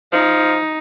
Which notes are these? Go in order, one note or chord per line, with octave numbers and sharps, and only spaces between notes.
F3 D#4